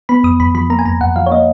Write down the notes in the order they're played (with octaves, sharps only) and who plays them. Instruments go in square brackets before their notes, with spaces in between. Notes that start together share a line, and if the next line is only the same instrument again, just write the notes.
[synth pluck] B3 B5
F2 D#6
F2 B5
F3 B5
A#3 A#5
G#5
F2 A#5
F2 F#5
F3 F5
C#5
A#3 D#5